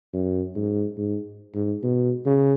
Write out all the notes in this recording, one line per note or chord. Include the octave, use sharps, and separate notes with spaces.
F#2
G#2
G#2
G#2
B2
C#3